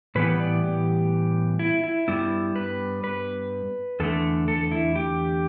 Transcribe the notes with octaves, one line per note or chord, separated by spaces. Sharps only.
A2 E3 G3 B3 B4
D5
G4
E4
E4
G2 G3 B3 E4
B4
B4
E2 D3 A3 A4
A4
E4
G4